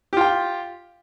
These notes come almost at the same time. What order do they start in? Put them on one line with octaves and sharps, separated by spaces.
G4 F4 G5